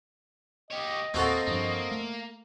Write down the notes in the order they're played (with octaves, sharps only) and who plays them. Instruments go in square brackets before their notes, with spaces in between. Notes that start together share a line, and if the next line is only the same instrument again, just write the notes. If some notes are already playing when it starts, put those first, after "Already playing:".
[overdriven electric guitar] G4 C#5 [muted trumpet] D#5
[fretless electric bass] D#2 [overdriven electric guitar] A#3 [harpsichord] C4 F#4 A4
[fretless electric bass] G2 F3 [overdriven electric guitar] A#3
[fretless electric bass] A3